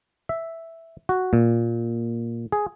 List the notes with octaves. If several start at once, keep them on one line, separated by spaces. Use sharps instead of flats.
E5
F#4
A#2
G#4